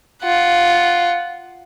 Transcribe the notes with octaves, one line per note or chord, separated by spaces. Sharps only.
F4 F#5